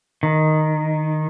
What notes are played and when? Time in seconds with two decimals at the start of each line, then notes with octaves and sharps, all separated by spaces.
0.23 D#3